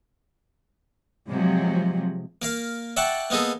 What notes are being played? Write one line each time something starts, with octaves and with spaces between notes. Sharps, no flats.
C3 F3 F#3 G#3
A#3 A#4 F5
D5 E5 F#5 G5 A5 C#6
A#3 B3 D#4 G#4 A4